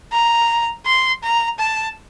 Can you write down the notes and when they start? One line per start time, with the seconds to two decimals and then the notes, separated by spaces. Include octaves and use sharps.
0.12 A#5
0.86 C6
1.23 A#5
1.59 A5